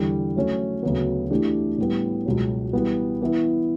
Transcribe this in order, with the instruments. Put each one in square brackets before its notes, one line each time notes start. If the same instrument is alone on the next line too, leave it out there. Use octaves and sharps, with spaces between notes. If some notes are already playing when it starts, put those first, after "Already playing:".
Already playing: [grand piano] E2 D3 G3
F#3 A3 C#4
D2 C#3 F#3 B3
E3 A3 D4 G4
A2 G3 B3
C#2 B2 F#3
E3 G3 B3
E3 B3 E4